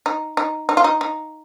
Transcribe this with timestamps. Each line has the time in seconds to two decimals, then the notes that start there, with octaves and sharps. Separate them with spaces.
0.06 D#4
0.37 D#4
0.69 D#4
0.77 F4
0.84 D#4
1.01 D#4